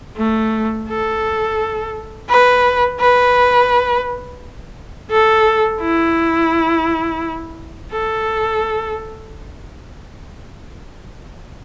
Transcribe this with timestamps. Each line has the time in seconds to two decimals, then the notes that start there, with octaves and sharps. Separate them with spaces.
0.17 A3
0.88 A4
2.29 B4
3.00 B4
5.10 A4
5.81 E4
7.92 A4